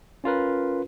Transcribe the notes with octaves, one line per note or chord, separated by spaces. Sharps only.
C#4 F4 A#4 B4